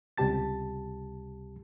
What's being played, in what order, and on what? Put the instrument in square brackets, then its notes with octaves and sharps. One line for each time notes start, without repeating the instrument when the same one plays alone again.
[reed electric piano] C#2 C3 G3 G4 A5 A6